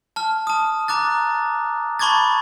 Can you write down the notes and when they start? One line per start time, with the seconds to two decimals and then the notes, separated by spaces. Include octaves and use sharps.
0.16 A5 F6
0.47 A5 D#6
0.88 A#5 D6 F#6 A6
1.99 A5 B5 C#6 D6 G#6 A6